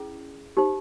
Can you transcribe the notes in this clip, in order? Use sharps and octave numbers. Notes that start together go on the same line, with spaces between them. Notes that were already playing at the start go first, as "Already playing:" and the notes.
Already playing: C#4 E4 G#4
D#4 G4 C5